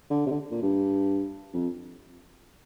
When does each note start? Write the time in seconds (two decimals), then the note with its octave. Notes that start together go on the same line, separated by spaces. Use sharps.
0.11 D3
0.27 C3
0.31 D3
0.51 A#2
0.62 G2
1.54 F2